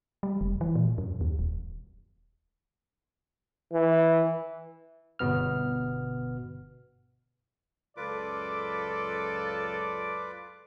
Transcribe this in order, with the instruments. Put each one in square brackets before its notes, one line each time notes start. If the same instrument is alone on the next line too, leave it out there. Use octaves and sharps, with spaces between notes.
[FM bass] G3
F1
E3
A#2
F#2
D#2
D#1
[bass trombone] E3
[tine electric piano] G1 B2 B3 F6
[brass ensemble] C#2 F#2 A4 [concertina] F4 B4 D6 [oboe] D5